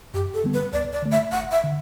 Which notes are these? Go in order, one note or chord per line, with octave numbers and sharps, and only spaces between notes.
F#2 G4
A4
D3 G3 B3
B4
D2 D5
D5
D3 A3
E5
G1 F#5
E5
D3